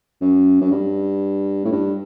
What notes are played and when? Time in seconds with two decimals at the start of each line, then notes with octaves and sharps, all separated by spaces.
0.21 F#2
0.61 F#2
0.71 G2
1.65 A2
1.72 G2